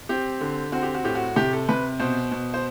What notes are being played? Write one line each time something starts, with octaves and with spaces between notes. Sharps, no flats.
C4 G4
D3
C4 F#4
G4
F#4
A2 G4
F#4
C3 G4
A4
C3 B4
B2 C5
B2
C5